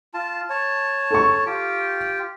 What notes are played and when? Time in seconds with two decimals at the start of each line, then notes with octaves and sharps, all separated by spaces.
0.14 F4 A5
0.50 C#5 A5
1.11 A4 C#6
1.46 F4 G4 G5